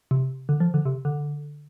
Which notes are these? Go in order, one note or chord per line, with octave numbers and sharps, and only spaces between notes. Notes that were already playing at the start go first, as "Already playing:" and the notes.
C3
D3
F3
D3
C3
D3